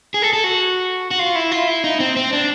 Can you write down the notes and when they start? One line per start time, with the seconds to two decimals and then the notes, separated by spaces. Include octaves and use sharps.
0.14 G#4
0.22 A4
0.33 A4
0.44 F#4
1.11 F#4
1.19 F4
1.35 E4
1.51 F4
1.67 E4
1.84 D#4
2.00 C4
2.16 C4
2.33 D4